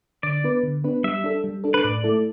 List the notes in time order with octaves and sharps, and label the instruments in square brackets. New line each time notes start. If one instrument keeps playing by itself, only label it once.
[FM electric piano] D3 [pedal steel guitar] D5
[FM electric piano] B3 D4 B4
D3
B3 D4 B4
[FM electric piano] G3 [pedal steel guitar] E5
[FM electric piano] D4 A4
G3
D4 A4
[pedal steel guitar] B4
[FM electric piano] A2 [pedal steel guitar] D5
[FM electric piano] A3 E4 A4